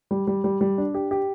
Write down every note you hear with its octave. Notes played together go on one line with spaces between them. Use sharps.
G3
G3
G3
G3
D4
G4
G4